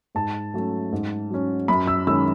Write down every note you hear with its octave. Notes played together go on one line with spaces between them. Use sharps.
G#2 A5
F#3 A3 C#4
G#2
F#3 C#4
F#2 B5
E6
D#3 G#3 C#4 E6